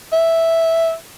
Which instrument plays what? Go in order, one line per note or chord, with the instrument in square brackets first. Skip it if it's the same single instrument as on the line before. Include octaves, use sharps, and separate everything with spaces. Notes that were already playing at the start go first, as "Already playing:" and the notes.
[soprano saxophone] E5